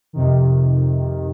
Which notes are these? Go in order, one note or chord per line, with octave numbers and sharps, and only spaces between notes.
F2 C3 D#3